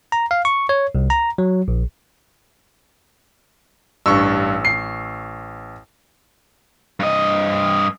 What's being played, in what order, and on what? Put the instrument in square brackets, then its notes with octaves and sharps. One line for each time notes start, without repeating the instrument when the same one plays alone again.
[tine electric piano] A#5
F5
C#6
C#5
C2
A#5
F#3
A#1
[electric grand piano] A1 C#6 E6 [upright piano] G2
[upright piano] C7
[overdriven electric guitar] G2 D#5